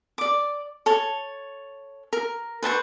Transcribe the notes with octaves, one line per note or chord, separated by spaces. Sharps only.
D5 D6
A4 C#5
A#4
B4 C5 A5 C#6